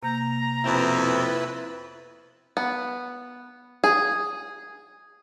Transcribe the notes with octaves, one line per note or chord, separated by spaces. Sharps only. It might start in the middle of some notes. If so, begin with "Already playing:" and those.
C3 A#3 A#5 G6
F2 B2 C4 E4 B4
B3
G#4